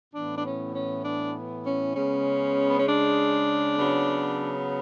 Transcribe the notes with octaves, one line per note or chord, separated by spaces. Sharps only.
A2 E3 B3 D4
D4
C#4
C#4
D4
C#4
C#3 G#3 B3 C#4
B3
C#4
D4
C#3 F#3 B3